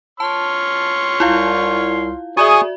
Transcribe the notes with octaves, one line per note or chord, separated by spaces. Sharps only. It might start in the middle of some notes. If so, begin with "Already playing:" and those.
C#5 A5 C6 F6
C2 E4 F4 F5
F#4 G#4 D5 E5 G#5 C#6 D#6